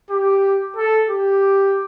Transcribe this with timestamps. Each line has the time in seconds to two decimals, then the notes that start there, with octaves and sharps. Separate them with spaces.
0.11 G4
0.77 A4
1.09 G4